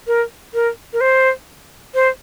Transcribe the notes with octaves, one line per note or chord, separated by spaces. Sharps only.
A#4
A#4
A#4
C5
C5